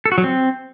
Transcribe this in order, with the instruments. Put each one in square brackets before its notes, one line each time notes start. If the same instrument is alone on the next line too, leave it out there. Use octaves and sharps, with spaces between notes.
[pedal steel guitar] A4
F#4
F#3
C4